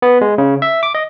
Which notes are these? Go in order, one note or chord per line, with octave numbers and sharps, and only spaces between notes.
B3
G#3
C#3
E5
D6
D#5